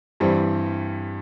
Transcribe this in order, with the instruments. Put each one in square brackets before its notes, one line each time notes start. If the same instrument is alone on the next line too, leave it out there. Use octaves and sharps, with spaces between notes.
[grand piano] G2 E3 G3 C4